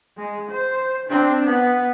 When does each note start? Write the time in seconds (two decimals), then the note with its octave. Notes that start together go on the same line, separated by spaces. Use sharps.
0.17 G#3
0.50 C5
1.09 C4 D4
1.45 B3